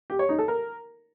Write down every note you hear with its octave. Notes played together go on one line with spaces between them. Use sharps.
G4
C#5
D#4
A4
A#4